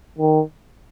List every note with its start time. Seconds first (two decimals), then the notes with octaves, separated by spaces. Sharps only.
0.18 D#3